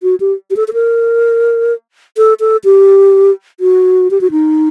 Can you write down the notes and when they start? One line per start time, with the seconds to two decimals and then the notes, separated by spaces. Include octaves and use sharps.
0.03 F#4
0.20 G4
0.51 G4
0.56 A4
0.68 A4
0.73 A#4
2.17 A4
2.40 A4
2.64 G4
3.60 F#4
4.11 G4
4.21 F#4
4.31 D#4